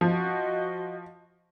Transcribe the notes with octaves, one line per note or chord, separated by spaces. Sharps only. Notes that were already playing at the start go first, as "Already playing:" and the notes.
F3 F#4 D#5